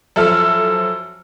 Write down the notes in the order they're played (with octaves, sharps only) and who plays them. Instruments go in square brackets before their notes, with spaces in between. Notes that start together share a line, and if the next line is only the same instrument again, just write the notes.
[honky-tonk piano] F#2 F3 A4 E5 F6